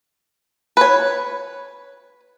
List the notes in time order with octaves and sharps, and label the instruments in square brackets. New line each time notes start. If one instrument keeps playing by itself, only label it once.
[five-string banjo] B4 C#5